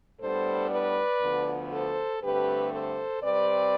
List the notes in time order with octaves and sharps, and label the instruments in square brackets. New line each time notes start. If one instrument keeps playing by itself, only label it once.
[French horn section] A2 G3 B3 D4 A4 C5
B4 D5
D2 D3 F3 B3
A4 C5
G2 D3 A3 C4 G4 B4
A4 C5
C3 G3 C4 B4 D5